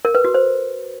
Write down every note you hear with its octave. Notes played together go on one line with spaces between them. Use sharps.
A#4
B4
F#4
C5